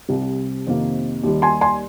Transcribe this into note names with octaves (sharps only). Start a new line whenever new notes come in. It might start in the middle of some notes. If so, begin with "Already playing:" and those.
C2 C3 G3 C4
F2 C3 D#3 A#3
D#2 D#3 G3
G#5 C6
G#5 C6